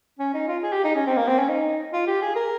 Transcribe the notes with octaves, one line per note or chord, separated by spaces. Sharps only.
C#4
D#4
F4
G#4
G4
D#4
C#4
C4
A#3
C4
C#4
D#4
F4
G4
G#4
A#4